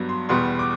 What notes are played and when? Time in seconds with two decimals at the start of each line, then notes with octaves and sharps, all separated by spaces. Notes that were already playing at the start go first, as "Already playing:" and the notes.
Already playing: G2 F#3 B3
0.09 C6
0.29 E2 B2 G3 B3 C6
0.59 D6